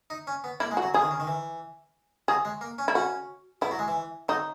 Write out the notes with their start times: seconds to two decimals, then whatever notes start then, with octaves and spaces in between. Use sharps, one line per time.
0.10 D#4
0.27 C#4
0.44 B3
0.60 A#3 E4
0.71 G#3
0.77 F#4
0.82 F#3
0.94 E3 G#4
1.02 D#3
1.11 C#3
1.20 D#3
1.27 E3
2.28 F#3 G#4
2.45 G#3
2.61 A#3
2.78 C#4
2.88 E4
2.95 C#4 F#4
3.62 B3 E4
3.71 F#3
3.79 G#3
3.88 E3
4.29 F#3 D#4